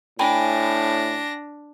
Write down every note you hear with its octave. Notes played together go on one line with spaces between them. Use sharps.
A2 D4 G5 G#5 B5 A#6